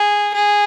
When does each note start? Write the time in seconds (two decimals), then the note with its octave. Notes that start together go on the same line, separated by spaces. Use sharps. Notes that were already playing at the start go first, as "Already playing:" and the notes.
Already playing: G#4
0.34 G#4